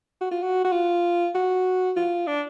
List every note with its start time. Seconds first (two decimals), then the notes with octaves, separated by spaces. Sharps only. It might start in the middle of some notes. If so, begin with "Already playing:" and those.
0.21 F#4
0.31 F4
0.43 F#4
0.65 F#4
0.72 F4
1.35 F#4
1.97 F4
2.27 D4